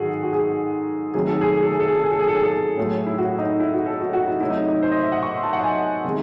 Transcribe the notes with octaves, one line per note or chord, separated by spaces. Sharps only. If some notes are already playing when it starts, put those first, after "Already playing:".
Already playing: G#2 D#3 G#3 F#4 G#4 A4
F#4
G#4
C3 D#3 F#3 A3 G#4
A4
G#4
G#4
A4
G#4
A4
G#4
A4
G#4
A4
G#4
A4
G#4
A4
G#4
A2 F#3 A3
E4
F#4
D#4
E4
F#4
A4
F#4
F#4
E4
C3 F#3 A3 E4
D#4
D#4
C5
D#5
E5
F#5
C#6
C6
A5
F#5
G#5
C3 D#3 G#3